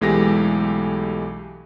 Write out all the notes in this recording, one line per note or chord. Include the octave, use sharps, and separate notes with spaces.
B1 E3 G#3 A3 G4 A#6